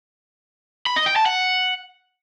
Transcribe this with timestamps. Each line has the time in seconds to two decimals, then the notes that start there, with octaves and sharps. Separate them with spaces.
0.87 B5
0.96 D#5
1.06 G5
1.16 A5
1.26 F#5